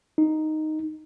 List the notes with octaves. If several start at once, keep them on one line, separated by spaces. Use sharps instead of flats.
D#4